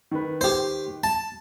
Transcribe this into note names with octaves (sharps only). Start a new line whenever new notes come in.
D#3 B4
G4 C5
A5